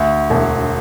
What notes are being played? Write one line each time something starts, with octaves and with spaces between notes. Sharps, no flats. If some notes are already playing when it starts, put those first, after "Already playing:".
Already playing: D2
E1